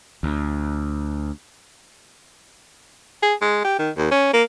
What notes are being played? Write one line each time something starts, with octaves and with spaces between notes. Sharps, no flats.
D2
G#4
G#3
G4
D#3
D#2
C#4
A#3